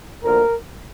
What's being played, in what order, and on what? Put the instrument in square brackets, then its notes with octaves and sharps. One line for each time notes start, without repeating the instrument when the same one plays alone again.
[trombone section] D2 D3 F3 A#3 A#4